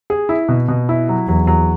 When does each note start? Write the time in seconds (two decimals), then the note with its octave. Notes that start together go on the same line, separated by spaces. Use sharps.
0.10 G#4
0.29 E4
0.48 B2
0.68 B2
0.89 E4
1.09 F#3
1.28 E2 F#3
1.47 F#3